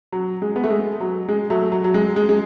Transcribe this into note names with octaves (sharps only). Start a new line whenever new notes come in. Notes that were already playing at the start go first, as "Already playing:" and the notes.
F#3
G#3
B3
A3
G#3
F#3
G#3
F#3 A3
F#3
F#3
G#3
G#3
G#3